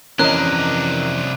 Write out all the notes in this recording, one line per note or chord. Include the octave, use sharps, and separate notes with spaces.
F2 C3 E3 C#4 D4 A#4 D#5 F#6